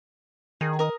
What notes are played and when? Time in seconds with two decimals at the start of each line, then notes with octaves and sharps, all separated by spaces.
0.61 D#3 G#4
0.79 A#4 D#6